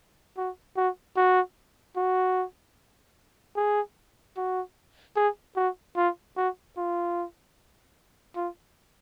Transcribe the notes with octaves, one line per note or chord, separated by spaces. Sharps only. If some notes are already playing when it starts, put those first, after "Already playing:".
F#4
F#4
F#4
F#4
G#4
F#4
G#4
F#4
F4
F#4
F4
F4